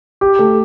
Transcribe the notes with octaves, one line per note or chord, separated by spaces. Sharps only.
G4
A3